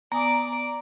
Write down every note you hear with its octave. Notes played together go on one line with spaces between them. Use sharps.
B3 D5 G#5 A#5 D6 D#6